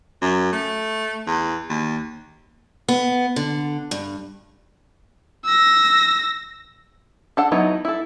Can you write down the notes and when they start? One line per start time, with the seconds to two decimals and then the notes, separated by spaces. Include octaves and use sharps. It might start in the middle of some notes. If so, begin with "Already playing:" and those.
0.22 F#2
0.53 A3
1.27 E2
1.69 D#2
2.88 B3
3.36 D3
3.91 G2
5.45 E6 A#6
7.37 D4 A4 F#5
7.52 F#3 B3 D#4 E4
7.85 E4 A4